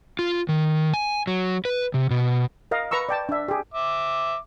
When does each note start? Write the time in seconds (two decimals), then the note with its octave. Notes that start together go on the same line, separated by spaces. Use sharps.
0.19 F4
0.49 D#3
0.94 G#5
1.27 F#3
1.65 B4
1.94 C3
2.10 B2
2.71 A#4 D#5 F5
2.91 B4 A#5 C#6 E6
3.09 D5 G5 A5
3.29 D4 E5
3.48 G4 G#4
3.74 E5 D6